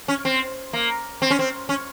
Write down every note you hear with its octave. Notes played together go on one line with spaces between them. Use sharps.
C#4
C4
A#3
C4
C#4
C4
C#4